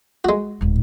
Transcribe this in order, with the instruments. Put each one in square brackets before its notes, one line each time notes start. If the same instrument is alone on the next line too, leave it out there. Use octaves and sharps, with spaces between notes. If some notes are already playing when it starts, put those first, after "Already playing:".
[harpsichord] G#3 F#4
[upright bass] D1 G#2